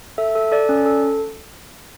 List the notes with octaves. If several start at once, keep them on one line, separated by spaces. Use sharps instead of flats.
A4 E5
A4
A4 D5
C#4
A4